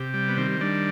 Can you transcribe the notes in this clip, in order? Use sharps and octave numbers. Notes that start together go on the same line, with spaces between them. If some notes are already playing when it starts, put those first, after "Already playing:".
Already playing: C3 G4
G3
B3
D#3 C4
G3 D4